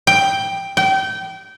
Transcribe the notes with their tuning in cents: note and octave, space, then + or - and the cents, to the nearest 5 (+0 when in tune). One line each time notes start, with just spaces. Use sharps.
G5 +5
G5 -25